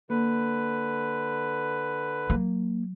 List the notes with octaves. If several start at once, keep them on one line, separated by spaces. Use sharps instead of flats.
D3 A#3 B4
F#3 A#3